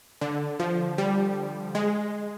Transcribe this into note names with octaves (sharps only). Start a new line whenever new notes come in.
D3
F3
G3
G#3